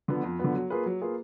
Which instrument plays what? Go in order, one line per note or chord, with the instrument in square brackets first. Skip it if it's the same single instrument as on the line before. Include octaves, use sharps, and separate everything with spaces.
[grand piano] D3 F3 B3
F2
D3 F3 B3
F#3
A#3 F4 G#4 B4
F#3
A#3 F4 G#4 B4